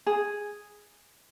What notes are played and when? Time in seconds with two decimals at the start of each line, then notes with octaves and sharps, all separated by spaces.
0.06 G#4